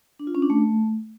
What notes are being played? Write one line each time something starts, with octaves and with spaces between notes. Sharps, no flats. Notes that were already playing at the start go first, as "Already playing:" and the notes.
D4
F4
C#4
D4
A3